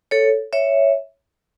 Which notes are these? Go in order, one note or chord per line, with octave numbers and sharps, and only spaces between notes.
A4 C#5
C#5 E5